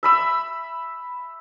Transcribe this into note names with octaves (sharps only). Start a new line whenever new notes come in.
E5 B5 E6